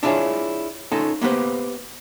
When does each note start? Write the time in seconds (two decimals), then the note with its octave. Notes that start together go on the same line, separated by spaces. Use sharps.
0.03 D4 E4 F4 G4 G#4 C#5
0.91 C#4 D#4 F4 A4
1.21 A#3 B3 G4 B4 C5